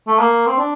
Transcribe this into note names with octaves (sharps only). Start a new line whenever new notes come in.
A3
A#3
C4
D4